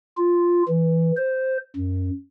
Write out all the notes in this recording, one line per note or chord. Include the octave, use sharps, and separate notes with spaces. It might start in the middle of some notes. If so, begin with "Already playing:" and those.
F4
E3
C5
F#2